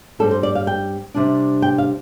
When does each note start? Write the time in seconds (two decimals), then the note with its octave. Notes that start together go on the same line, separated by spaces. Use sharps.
0.19 G2 G3 C4 A4
0.31 C5
0.43 D5
0.55 F5
0.67 G5
1.14 C3 G3 D4
1.62 G5
1.78 F5